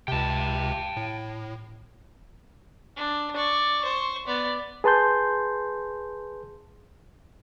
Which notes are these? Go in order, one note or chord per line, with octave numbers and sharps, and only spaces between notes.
C#2 C3 G5 A5
A2
D4
D5 C#6
C5 C#6
B3 D5
G#4 B4 A5 C6 G6